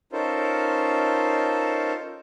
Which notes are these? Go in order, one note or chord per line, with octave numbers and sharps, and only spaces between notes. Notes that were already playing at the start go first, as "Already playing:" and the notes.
C#4 D#4 F4 A4 A#4 C5